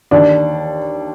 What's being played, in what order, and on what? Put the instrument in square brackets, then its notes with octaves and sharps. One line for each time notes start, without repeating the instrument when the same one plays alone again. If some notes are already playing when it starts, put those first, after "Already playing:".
[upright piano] D#2 D4